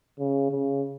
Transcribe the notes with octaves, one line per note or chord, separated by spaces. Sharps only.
C#3
C#3